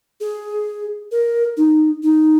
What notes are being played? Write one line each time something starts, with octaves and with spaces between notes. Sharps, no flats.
G#4
A#4
D#4
D#4